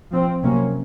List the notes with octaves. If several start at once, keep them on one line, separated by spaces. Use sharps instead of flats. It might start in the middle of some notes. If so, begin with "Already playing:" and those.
F3 C4
C3 F#3 A#3 C#4